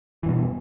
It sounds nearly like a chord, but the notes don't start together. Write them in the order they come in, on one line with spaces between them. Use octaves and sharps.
E3 G2 B2